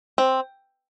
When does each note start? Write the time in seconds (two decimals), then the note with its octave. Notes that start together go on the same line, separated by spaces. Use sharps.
0.18 C4